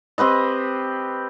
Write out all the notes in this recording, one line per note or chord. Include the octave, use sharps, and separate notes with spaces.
C4 G4 B4 D#5